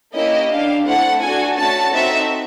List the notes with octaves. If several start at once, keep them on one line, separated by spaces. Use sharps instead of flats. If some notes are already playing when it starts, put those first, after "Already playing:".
A#3 C#4 E4 G4 D#5
D4 G4 F5
A3 C4 E4 A4 F#5
D4 F#4 A4 G#5
A3 C#4 F#4 A5
C4 D#4 F#4 A4 E5